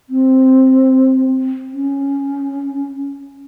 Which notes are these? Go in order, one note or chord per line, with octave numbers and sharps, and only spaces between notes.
C4
C#4